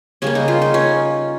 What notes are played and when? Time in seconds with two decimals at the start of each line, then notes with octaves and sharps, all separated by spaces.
0.22 C#3 G3 A#3 C#4
0.35 D#4
0.48 F4
0.62 D#4
0.74 C#4